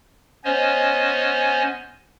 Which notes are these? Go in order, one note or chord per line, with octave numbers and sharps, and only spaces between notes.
B3 C#4 C5 C#5 D#5 G#5